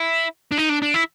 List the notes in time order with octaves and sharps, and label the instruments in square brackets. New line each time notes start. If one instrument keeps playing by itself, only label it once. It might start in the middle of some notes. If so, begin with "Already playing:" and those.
Already playing: [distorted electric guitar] E4
D4
D#4
D4
D4
E4